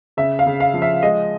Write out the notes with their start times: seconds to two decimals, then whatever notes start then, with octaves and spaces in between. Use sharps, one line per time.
0.17 C#3 E5
0.39 F5
0.47 C#3
0.60 F5
0.74 F3
0.82 E5
1.02 G#3 D#5